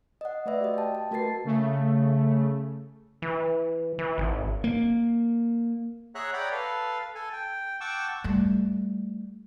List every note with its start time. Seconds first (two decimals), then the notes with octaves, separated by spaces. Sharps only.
0.21 D#5 F#5
0.46 A3 B4 D5 E5
0.61 F#4 G4 D#5
0.74 G5 A5
0.95 A5
1.11 A3 F#4 A#4 B4 A6 C7
1.45 C#3 A3
3.22 E3
3.99 E3
4.18 G#1
4.64 A#3
6.15 G#4 C#5 E5 F#5 A#5 F#6
6.33 C#5 D5 F#5 G5 A#5 B5
6.52 A4 B4 F5
7.15 A4 G#5
7.33 G5
7.81 F#5 G5 A5 C#6 D6 E6
8.24 G3 A3